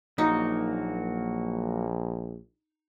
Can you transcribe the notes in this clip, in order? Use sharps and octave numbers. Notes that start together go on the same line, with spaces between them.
A#1 F#3 A#3 D#4 F#4